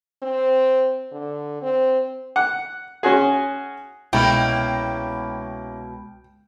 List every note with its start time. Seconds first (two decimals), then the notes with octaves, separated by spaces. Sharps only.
0.22 C4
1.12 D3
1.62 C4
2.36 F#5
3.03 C#4 F#4 G#4
4.13 C2 B2 G#3 A#3 C#4 E4 G5 B5